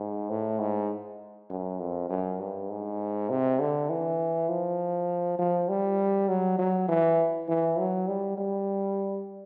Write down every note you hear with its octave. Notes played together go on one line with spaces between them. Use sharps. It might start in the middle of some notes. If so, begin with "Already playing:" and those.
Already playing: G#2
A2
G#2
F#2
F2
F#2
G2
G#2
C3
D3
E3
F3
F3
G3
F#3
F#3
E3
E3
F#3
G3
G3